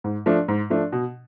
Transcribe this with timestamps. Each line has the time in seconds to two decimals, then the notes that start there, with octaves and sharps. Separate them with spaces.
0.04 G#2
0.26 F3 A3 D4
0.48 G#2
0.70 F3 A3 D4
0.92 B2